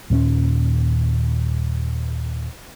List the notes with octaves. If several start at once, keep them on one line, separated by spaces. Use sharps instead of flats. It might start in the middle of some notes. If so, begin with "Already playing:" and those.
D#2 A#2 A3 C#4